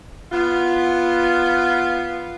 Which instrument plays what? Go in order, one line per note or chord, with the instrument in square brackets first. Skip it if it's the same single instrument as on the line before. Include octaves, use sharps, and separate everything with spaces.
[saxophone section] B3 F4